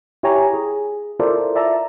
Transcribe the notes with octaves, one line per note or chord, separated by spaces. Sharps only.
E4 G4 C#5 G#5 A#5
G#4
E4 F4 A4 A#4 C5 D5
D5 E5 A5 A#5